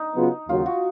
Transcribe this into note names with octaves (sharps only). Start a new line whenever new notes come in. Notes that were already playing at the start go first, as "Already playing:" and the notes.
Already playing: D#4
C#3 F#3 B3 F4
D#2 C#3 F#3 C#4 F4
F#4